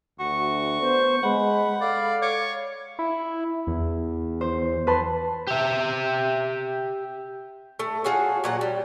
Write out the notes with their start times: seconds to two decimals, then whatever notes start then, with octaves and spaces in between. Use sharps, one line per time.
0.20 D2 F#4 C#6
0.81 B3 C5
1.23 G#3 F#5 B5
1.81 A4 D5 F5
2.22 C#5 D6
2.99 E4
3.67 E2
4.41 C5
4.87 B4 A5 C6
5.47 G4 E5
7.79 A3
8.04 F4 F#4 G#4 C#5
8.44 A#2 F#3 F#5
8.61 G3